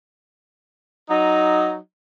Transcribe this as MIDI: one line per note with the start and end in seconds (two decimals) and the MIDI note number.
1.10 1.77 54
1.10 1.77 63